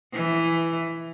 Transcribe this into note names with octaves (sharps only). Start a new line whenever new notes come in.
E3